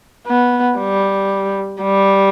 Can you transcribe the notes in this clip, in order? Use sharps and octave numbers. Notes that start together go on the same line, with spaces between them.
B3
G3
G3